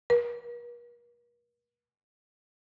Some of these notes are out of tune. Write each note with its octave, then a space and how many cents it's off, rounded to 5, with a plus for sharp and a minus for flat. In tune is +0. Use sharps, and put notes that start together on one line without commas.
A#4 +45